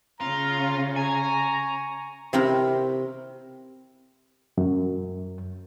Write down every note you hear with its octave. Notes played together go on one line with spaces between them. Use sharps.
C#3 F4 A#5
G#5 A#5 C#6
C3 C4 E4 A#4
F#2